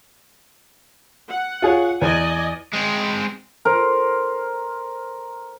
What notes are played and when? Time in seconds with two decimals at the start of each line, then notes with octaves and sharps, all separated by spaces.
1.28 F#5
1.62 F4 G#4 C#5
2.01 E2 D5 D#5 G#5
2.73 G#3 C4
3.65 A#4 C5